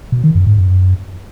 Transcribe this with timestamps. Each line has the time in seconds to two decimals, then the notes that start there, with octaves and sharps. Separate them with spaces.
0.12 B2
0.24 D#3
0.35 F#2
0.47 G#2
0.58 F#2